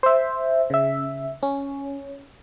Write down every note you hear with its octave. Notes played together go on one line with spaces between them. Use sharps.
C5 E5
C#3 E5
C#4